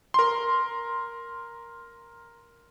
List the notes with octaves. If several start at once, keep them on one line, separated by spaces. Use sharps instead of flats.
A#4 C6